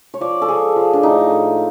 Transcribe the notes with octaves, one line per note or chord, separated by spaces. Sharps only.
C#5
F3 D5
A4
F3 G#4
F3
D4
A2 D#4
A2